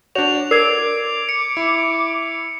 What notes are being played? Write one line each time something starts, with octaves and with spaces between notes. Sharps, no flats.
D4 F#4 C#5 F7
A#4 D5 D6 G#6 C7
C#7
E4